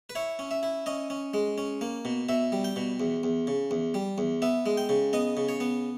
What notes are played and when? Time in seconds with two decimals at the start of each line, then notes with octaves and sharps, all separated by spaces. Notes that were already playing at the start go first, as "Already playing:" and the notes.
0.10 B4
0.15 E4 C#5
0.39 C#4
0.51 E5
0.63 E4
0.86 C#4 D#5
1.10 C#4
1.34 G#3
1.58 C#4
1.81 A#3
2.05 B2
2.29 B2 E5
2.52 G3
2.64 G5
2.76 B2
3.00 E2
3.23 E2
3.47 C#3
3.71 E2
3.94 G3
4.18 E2
4.42 B3 E5
4.66 G#3
4.77 G5
4.89 C#3
5.13 B3 D#5
5.37 C#3
5.49 C#5
5.60 B3